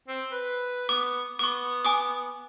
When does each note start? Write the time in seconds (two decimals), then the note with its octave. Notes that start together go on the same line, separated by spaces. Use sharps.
0.08 C4
0.32 B4
0.89 B3 D6
1.39 B3 C#6 D6
1.85 G#5 D6 D#6